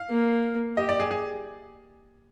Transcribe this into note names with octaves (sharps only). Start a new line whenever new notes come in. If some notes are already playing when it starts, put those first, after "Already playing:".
Already playing: F5
A#3
G4 D#5
D5
G#4
G#4